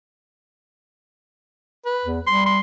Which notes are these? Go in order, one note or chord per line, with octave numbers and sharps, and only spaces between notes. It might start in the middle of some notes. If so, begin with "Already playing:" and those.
B4
E2
G3 C6
C6